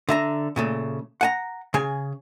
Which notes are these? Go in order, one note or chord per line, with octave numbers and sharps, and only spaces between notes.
D3 E5 A#5
A#2 C#3 A3
F#5 G#5 A#5
C#3 G#4 G#5